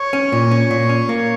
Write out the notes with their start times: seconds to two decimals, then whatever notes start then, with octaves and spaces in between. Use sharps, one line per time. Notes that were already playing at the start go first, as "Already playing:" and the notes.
Already playing: C#5
0.13 C#4
0.32 A#2
0.51 C#4
0.71 A#2
0.89 C#4
1.09 A#3